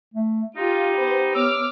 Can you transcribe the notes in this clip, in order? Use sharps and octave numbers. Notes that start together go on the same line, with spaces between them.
A3
D#4 F4 G4
B3 C5
B3 C#5 D6 E6 F6